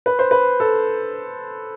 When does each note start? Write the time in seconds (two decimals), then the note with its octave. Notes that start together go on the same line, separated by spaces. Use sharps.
0.06 B4
0.19 C5
0.31 B4
0.60 A4